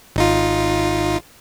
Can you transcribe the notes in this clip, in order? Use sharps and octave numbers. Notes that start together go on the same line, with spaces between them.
G#1 D#4 F4